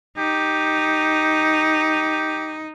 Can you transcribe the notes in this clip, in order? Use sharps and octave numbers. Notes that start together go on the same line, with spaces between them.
D#4 G4